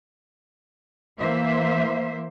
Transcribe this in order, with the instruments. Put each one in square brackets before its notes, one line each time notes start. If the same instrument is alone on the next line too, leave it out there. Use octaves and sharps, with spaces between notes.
[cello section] E3 A#3 C5 E5